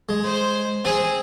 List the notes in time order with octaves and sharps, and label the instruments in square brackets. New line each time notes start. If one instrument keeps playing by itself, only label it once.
[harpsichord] G#3
[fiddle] C5
[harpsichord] C4 [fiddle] G#4